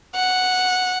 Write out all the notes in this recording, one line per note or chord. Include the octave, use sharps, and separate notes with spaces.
F#5